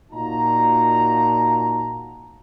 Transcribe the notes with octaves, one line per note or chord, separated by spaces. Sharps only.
A#2 D#4 F4 F#4 A5 A#5